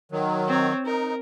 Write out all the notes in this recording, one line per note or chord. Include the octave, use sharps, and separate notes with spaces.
D#3 F#3
C4 C#5
D#4 A#4